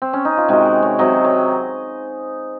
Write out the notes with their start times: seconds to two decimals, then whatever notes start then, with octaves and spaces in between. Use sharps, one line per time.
0.02 C4
0.13 C#4
0.25 D#4
0.37 F4
0.48 C3 D#3 G#3 F#4
0.65 G#4
0.82 C#5
0.99 C3 F#3 D#5
1.24 C#5